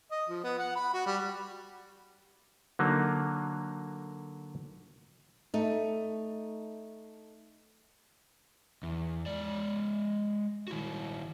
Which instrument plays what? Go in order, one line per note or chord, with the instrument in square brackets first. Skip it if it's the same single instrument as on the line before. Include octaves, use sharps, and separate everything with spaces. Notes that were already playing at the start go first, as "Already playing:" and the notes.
[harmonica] D#5
F3
B3
F#5
B5
F#4
G3
[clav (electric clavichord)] D3 F#3 A#3 D#4
[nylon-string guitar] A3 D#4
[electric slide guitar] E2
G#3 D5
D#3 E4 F#4